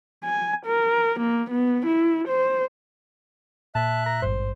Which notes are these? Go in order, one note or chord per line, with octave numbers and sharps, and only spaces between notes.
G#5
A#4
A#3
B3
E4
C5
A#2 E5 A5 F#6
A#5
G#1 G2 C5